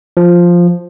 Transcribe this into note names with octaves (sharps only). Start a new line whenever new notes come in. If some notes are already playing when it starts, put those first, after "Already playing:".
F3